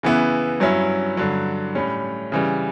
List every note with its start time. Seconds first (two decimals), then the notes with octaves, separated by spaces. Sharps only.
0.03 C#3 E3 B3 E4
0.60 G2 F#3 C#4 E4
1.17 G2 D3 F#3
1.75 A2 G3 C#4
2.32 C#3 E3 G3